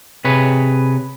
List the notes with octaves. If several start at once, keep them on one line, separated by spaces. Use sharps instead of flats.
C3 G#4 B4 C#5